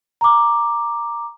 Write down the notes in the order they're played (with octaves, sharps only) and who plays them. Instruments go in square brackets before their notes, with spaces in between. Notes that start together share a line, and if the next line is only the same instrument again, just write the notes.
[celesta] A#5 D6